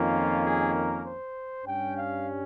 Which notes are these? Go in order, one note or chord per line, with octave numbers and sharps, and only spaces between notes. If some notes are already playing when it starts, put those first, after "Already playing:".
Already playing: F2 D#3 A#3 C#4 F4
G#4
A#4
C5
G2 G3 C#4 G5
F5